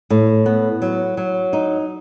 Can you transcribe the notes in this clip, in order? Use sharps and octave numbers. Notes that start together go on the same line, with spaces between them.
A2
B3
F#3
F#3
D#4